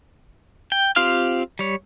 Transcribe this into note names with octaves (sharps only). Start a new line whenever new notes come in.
G5
C4 F4 G4 F5 F6
G3 C#5